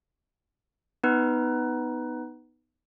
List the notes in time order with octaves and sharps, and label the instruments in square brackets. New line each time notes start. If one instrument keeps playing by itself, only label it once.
[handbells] B3 D#4 B4